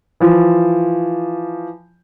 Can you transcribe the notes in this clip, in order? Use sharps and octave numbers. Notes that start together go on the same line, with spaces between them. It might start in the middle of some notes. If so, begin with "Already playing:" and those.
E3 F3